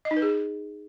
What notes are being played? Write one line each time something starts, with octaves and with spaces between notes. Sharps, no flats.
D#5
D#4
B4
G#4